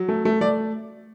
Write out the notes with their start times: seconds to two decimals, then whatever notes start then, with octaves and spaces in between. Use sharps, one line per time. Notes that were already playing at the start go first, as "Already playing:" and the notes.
Already playing: F#3
0.09 A3
0.25 A3
0.41 A3 D5